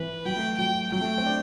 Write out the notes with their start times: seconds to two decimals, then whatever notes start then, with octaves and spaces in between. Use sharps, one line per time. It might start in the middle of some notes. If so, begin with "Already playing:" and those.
Already playing: E3 B4
0.25 F#3 G5
0.36 A3
0.58 F#3 G5
0.92 F#3 G5
1.01 A3
1.18 C4
1.26 D4